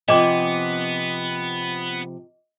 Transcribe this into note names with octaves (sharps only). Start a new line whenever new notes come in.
C3 F3 B3 D#5 G#5 D6